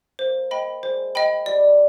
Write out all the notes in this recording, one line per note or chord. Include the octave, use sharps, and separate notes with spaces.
A#3 C5
D#5 G5 B5
G#3 C5
D#5 G5 B5
G3 D5